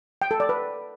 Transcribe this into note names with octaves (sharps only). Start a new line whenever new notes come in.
G5
A4
D5
B4